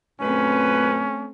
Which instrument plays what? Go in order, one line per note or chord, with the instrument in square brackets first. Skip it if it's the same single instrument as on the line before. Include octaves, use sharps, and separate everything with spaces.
[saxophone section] F#2 A#2 B4 [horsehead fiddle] A3 C4 [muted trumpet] C#4